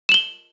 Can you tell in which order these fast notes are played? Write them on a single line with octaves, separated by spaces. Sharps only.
E7 F#7 G7